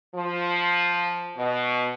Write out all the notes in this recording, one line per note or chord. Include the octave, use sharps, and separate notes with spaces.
F3
B2